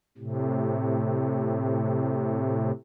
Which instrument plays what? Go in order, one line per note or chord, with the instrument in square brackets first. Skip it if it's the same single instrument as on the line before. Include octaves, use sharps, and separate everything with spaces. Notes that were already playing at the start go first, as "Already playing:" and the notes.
[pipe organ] A2 C3